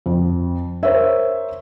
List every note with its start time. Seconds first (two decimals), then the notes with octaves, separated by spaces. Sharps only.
0.06 F2
0.83 A#4 C5 C#5 E5